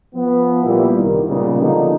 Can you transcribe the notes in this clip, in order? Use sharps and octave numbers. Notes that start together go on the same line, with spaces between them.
F3 B3
A#2 G3 E4
C2 D#3
A#2 C#3 G3 G#3 B3 D#4
D3 F3 A#3 D#4